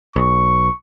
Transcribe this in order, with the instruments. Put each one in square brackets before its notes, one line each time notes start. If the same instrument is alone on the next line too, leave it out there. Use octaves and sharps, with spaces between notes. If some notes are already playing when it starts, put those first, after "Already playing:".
[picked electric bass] B1 [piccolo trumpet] C#6